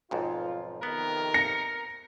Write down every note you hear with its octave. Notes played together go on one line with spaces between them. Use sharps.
B1 F2 G#2 F4
F2 C3 D#3 B3 A#4
A#6 C#7